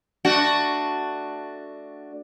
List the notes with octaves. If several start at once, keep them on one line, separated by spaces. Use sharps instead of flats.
A3 D4 F#4